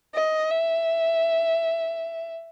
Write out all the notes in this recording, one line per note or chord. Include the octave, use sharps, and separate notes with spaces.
D#5
E5